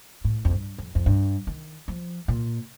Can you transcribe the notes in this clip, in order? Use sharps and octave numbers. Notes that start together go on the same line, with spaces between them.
A2
F2
G2
F2
F2
G2
D#3
F3
A#2